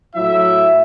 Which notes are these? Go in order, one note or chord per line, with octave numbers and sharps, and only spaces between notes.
A2 F#3 E4 E5